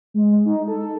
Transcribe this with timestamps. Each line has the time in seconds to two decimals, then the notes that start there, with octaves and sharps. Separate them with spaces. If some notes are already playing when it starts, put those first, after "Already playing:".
0.14 G#3
0.45 D#4
0.68 A4